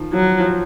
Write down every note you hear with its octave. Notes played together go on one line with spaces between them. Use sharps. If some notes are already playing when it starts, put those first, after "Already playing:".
Already playing: D#3 F3
F3 F#3
F3